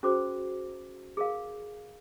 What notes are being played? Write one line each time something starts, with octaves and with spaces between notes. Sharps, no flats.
C#4 F#4 G#4 C5 D6
G#4 A#4 F5